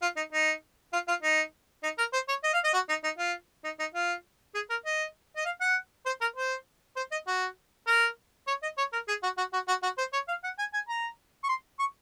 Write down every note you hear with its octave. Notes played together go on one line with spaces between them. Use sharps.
F4
D#4
D#4
F4
F4
D#4
D#4
A#4
C5
C#5
D#5
F5
D#5
F#4
D#4
D#4
F4
D#4
D#4
F4
G#4
A#4
D#5
D#5
F5
F#5
C5
A#4
C5
C5
D#5
F#4
A#4
C#5
D#5
C#5
A#4
G#4
F#4
F#4
F#4
F#4
F#4
C5
C#5
F5
F#5
G#5
G#5
A#5
C#6
C6
C#6